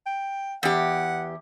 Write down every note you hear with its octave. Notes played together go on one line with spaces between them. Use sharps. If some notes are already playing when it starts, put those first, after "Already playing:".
G5
E2 G4 F#5